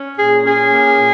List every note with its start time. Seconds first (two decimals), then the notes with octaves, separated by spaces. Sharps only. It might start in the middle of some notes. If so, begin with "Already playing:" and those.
Already playing: C#4
0.18 A#2 G#4
0.44 C#4 G#4
0.71 A#3
0.97 A#2